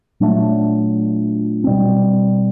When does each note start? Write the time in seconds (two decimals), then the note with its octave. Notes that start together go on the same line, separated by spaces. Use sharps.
0.20 A#2 F#3 A3 D4
1.64 B2 G3 C4